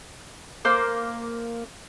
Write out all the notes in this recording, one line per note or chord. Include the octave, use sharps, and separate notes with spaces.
A#3 C5 D6